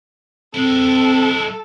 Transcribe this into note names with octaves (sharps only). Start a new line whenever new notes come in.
G#3 C4 E4 A4